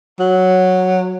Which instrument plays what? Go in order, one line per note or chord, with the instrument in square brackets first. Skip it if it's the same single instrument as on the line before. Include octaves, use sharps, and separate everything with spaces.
[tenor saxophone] F#3